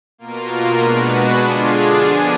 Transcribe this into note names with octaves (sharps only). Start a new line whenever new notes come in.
B2 A#3 F4 A#4
B2 G#3 D4 F#4 B4
D3 G#3 D4 F4 G#4
F3 B3 D4 G#4